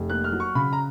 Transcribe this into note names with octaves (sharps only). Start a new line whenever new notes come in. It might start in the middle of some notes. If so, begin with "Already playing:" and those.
Already playing: F1
A#3 F#6
F6
F#3
C#6
C#3 B5
A#5